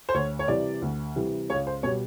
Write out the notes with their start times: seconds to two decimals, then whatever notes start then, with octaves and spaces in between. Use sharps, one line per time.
0.09 C5
0.14 D2 C#5
0.39 C#5
0.48 C3 E3 G3 D5
0.82 D2
1.16 C3 E3 G3
1.50 C#2 C#5
1.67 C5
1.83 B2 G3 C#5